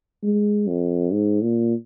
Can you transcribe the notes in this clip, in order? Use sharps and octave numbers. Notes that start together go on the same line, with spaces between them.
G#3
F2
G#2
A#2